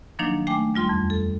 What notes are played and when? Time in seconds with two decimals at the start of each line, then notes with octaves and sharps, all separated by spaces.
0.19 D#3 F3 F#3 A#3 D4 D#4
0.47 A3 G5 G#5 D6
0.74 D#2 G3 F4 C6
0.89 F2
1.10 A4